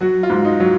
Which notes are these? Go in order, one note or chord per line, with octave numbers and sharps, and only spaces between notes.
F#3 F#4
F4
G#2
D#4
F#3